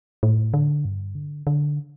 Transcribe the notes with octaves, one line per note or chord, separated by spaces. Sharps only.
A2
D3
G2
D3
D3